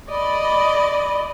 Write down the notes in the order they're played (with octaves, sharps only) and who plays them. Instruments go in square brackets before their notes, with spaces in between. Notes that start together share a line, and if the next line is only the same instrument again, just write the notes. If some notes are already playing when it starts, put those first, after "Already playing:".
[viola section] D5 D#5 [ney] B5